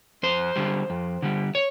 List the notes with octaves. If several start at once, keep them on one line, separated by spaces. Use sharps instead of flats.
F2 C5
D3 G3
F2
D3 G3
C#5